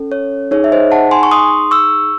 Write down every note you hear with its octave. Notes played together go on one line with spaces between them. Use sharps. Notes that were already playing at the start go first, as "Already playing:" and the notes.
Already playing: C#4 A4
C#5
D#4 G#4 C#5
E5
C5 D#5
F#5 A5
G#5 C6
C#6
C6 D#6
C#6 E6